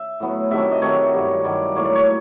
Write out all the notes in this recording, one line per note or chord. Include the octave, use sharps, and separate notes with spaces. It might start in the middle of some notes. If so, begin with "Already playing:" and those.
Already playing: E5
A2 F#3 B3
C3 D#3 F#3 A3 E5
E5
D#5
C3 D#3 F#3 A3 C#5
G2 D#3 F#3
G2 D#3 F#3 D5
A2 F#3 A#3 C#5
D5
C#5